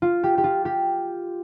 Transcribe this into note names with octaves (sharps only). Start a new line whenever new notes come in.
F4
G4
G4
F4
G4